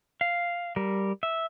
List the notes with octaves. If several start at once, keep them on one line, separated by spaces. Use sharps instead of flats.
F5
G3 A#4
E5